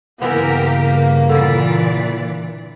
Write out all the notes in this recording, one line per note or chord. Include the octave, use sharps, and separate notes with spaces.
G2 C#3 E3 A#3 B3 G4 A#4
A#2 D3 E3 D5